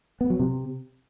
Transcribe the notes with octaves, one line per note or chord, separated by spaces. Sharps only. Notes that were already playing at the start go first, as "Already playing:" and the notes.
B3
F#3
C3